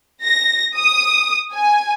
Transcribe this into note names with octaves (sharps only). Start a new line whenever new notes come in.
A#6
D#6
G#5